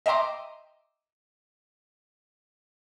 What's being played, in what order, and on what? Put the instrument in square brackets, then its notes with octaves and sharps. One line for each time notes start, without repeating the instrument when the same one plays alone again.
[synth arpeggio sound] D#5 E5 G5 A#5 C6 D6